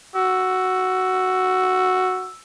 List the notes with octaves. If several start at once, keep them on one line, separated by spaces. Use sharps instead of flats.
F#4 E6